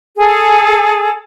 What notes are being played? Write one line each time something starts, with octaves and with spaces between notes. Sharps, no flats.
G#4 A4